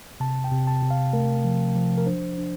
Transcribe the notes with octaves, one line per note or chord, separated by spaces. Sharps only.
C3 A5
G5
C3
A5
C3
F5
A3 A#4
F3
F3
A#4
D4 C5
D4